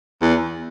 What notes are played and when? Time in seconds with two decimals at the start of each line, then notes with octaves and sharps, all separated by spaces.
0.22 E2